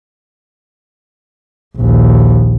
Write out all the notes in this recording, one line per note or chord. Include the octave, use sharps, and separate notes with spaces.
A#1 D#2